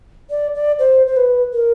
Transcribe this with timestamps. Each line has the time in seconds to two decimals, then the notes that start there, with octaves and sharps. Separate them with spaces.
0.30 D5
0.54 D5
0.79 C5
1.06 C5
1.16 B4
1.53 A#4